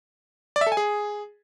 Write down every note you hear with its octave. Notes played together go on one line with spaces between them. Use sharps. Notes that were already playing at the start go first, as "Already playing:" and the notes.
D5
E5
A4
G#5
G#4